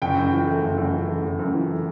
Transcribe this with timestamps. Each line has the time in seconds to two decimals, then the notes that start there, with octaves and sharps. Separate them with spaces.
0.02 F#1 G5
0.16 F#2
0.32 E3
0.47 A3
0.62 F#1
0.78 F#2
0.92 E3
1.08 A3
1.24 F#1
1.39 F#2
1.54 E3
1.69 A3